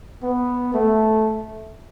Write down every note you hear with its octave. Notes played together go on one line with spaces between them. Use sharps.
B3
A3